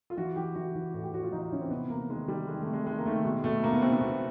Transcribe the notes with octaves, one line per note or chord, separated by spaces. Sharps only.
F4
E3 F#4
E3 G4
E3 F#4
E3
A2 F#4
G4
A2 F#4
F4
E3 D#4
D#4
E3 C#4
C4
C3 B3
C3 A#3
D#3 G#3
D#3 G3
D#3 G#3
A3
C3
G#3
D#3 G#3
A#3
D#3 A3
B2 G#3
B2 A3
B2 A#3
B3
B2 C4
B3
B2